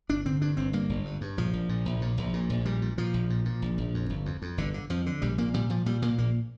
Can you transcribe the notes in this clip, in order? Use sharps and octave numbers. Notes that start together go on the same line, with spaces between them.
G1 D4
D3 C4
G2 D4
G1 C4
G2 A#3
G1
G2
G2
A#1 F3
A#1
A#2
A#1
A#2
A#1
A#2
A#1
A#2 G3
A#2
A#2 F3
A#1
A#2
A#2
A#1
A#1
F2
G1
F2
F2
G1 D3
D3
F2 F3
D3
A#1 G3
A#2 A#3
A#2 G3
A#2 F3
A#2 G3
A#2 A#3
A#1 A#3